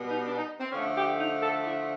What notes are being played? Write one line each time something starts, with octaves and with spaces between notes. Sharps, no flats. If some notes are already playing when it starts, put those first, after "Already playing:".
Already playing: B2 G3 B3
D#4
D4
D#4
C4
D3 F3 A3 C#4
G4
D#4
A4
E4